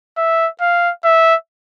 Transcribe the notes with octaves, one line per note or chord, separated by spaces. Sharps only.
E5
F5
E5